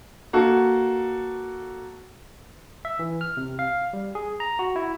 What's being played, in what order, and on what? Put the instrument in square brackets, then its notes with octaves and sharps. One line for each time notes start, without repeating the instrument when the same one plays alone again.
[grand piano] A#3 F#4 A4
[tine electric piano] E5
E3
F6
C3
F5
G3
G#4
A#5
F#4
E4